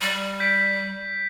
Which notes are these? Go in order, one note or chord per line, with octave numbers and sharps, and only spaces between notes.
G3
G6 B6 D7